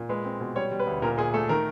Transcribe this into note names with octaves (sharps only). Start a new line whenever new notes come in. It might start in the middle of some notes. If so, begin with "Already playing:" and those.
Already playing: A#2
G#3 B4
C4
B2
G3 C#5
G3
B4
D2
A#2 A#4
A#2 G#4
A3 A4
D#3 A#4